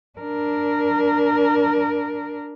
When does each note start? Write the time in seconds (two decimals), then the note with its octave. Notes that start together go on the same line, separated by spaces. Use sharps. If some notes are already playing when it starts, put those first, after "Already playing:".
0.19 D4 A#4